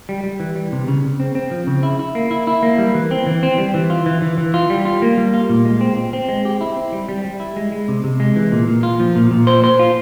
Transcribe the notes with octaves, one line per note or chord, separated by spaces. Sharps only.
G3
G3
E3
G3
C3
C#3
C#3
C4
C4
F3
C#3
E4
E4
A#3
E4
E4
A#3
G3
E3
C4
E3
C4
G3
E3
F4
E3
E3
E3
F4
G3
F4
A#3
G3
F4
A#2
G#3
C4
C4
C4
G#3
G4
E4
C4
G3
G3
G3
E4
G#3
G#3
C3
C3
G#3
E3
A#2
A#2
F4
F3
A#2
A#2
C5
C5
F4